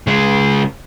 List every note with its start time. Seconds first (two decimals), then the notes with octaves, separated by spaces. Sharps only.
0.07 C#3 G#3